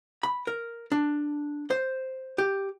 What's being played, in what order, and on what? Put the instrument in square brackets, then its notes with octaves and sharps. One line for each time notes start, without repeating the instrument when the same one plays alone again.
[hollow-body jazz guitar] B5
A#4
D4
C5
G4